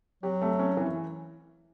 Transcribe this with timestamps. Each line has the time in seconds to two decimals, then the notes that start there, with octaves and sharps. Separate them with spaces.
0.23 F#3 G4
0.42 A3
0.59 C#4
0.77 E3